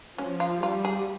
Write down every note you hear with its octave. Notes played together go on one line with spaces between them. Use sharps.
F3 C#4
F4
G3 F4
G#4